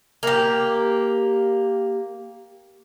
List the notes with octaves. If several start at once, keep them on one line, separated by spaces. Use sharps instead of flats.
A#3 G4